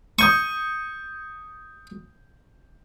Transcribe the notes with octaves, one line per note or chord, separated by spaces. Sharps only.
C#6 D#6 G6 D#7